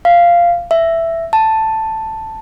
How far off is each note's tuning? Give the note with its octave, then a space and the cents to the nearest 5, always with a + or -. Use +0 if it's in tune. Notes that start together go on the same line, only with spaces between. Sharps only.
F5 -10
E5 +10
A5 +5